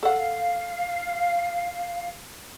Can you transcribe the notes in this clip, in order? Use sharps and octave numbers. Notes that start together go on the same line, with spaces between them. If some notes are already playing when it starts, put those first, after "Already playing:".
A4 F5 F#5